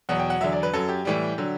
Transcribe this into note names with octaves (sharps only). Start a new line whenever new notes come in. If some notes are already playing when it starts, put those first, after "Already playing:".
E2 B2 F#3 F#5
G5
F#5
E2 D3 F#3 E5
D5
B4
F#2 F#3 A4
G4
A2 E3 G3
D3 F#3